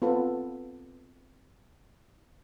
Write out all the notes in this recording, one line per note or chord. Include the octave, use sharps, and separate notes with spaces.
B3 C4 F4 A4 B4